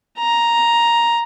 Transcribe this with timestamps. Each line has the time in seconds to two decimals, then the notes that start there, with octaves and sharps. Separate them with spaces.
0.18 A#5